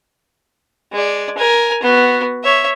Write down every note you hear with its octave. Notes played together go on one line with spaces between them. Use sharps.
G#3 D5
A#4 G#5
B3 F#4
C#5 E5